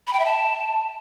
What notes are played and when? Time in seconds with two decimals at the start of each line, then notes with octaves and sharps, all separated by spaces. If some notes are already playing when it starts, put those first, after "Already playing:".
0.07 B5
0.13 G5
0.19 E5
0.25 A5